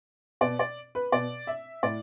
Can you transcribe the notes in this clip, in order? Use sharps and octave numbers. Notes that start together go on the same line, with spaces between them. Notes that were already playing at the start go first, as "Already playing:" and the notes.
B2 D5
D5
B4
B2 D5
E5
A2 D5